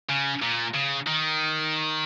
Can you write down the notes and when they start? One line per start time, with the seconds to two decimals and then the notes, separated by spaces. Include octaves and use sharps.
0.09 C#3
0.42 A#2
0.74 C#3
1.07 D#3